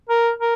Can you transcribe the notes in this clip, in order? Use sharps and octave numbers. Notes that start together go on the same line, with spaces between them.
A#4
A#4